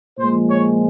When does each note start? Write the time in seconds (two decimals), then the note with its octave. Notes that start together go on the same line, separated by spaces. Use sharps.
0.19 A#2 F3 G#3 C5
0.49 C#5